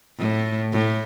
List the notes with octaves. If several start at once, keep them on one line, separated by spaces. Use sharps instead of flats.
A2
A2